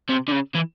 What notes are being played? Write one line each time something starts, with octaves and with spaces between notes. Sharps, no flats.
C3
D3
C#3
E3